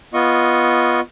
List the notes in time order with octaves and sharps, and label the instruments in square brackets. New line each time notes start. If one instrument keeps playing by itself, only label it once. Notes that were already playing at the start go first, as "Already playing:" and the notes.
[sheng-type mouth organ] B3 F4 D#5 C#6